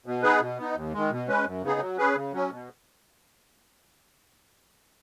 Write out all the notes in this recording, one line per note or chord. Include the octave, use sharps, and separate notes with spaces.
B2
B3 D#4 G#4 B4
B2
B3 D#4
D#2
D#3 G#3
B2
G#3 C#4 B4
F#2
C#3 B3 D#4 G#4
F#3
C#4 G#4 B4
C#3
F#3 C#4
B2